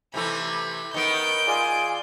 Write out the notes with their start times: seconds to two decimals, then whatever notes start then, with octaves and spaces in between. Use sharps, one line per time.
0.14 C3 E3 A3 B5
0.94 D#3 B3 G6 D7
1.47 F4 G#4 D5 G#5